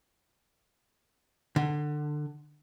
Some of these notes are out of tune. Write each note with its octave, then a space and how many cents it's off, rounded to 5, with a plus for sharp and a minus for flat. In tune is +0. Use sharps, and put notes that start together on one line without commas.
D3 +20